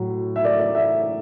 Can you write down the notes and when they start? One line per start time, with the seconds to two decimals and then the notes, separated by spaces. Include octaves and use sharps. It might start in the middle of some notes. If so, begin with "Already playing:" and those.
Already playing: A2 F#3
0.36 E5
0.44 D5
0.60 D5
0.75 E5